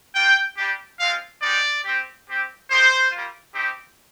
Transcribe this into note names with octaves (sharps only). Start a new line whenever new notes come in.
A#3 F4 G5
G3 D4 G4
G#3 C4 F4 F5
G#3 D#4 G4 D5
C4 G4
C4 G4
A#3 D#4 G4 C5
G3 A#3 F4
C4 D#4 G4